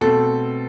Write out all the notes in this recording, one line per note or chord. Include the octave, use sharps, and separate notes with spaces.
B2 A3 C4 A4